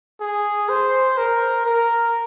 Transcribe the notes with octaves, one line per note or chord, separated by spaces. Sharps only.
G#4
C5
A#4
A#4